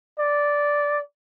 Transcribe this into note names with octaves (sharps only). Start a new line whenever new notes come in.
D5